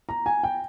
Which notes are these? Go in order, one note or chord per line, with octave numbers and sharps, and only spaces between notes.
A#5
G#5
G5